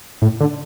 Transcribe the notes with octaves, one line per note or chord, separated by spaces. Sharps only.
A2
D3